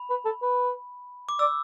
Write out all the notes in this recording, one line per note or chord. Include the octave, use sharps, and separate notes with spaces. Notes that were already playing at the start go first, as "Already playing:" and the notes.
Already playing: B5
B4
A4
B4
D6
D5 E6